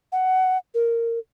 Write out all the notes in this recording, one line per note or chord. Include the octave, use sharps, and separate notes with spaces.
F#5
A#4